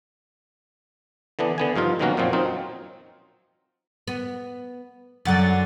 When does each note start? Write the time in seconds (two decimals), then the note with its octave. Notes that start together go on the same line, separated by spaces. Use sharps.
1.39 D3 E3 B3 D4
1.58 D3 B3 G#5
1.76 G2 F3 D#4 F4
1.99 B2 D#3 F#3 A#3 C#4 F#4
2.17 F#2 A#2 F3 C4
2.33 F#3 C4 D#4 F4
4.07 B3
5.25 F#2 D3 F#3 F#5 A6